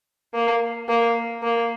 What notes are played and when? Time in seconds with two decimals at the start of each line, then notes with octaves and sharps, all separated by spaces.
0.34 A#3
0.89 A#3
1.43 A#3